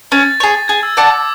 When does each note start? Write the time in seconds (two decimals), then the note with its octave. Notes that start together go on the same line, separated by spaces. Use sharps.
0.12 C#4 A6
0.40 G#4 C#5
0.68 G#4 G#6
0.83 E6
0.97 D5 F#5 A5 D6
1.11 E6